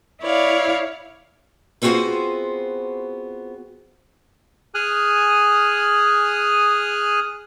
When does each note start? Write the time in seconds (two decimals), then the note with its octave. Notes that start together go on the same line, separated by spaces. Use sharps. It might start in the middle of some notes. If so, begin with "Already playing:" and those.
0.22 E4 C#5 D5 F5
1.82 B3 C4 F4 F#4 G#4 C5
4.75 G#4 G#5 D#6 F6 F#6